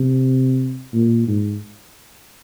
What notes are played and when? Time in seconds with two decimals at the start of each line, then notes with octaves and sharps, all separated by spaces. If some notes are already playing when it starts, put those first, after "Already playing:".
Already playing: C3
0.93 A#2
1.27 G#2